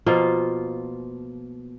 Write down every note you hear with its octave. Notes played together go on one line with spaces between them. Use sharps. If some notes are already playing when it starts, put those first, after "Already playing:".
B2 F3 A#3 F4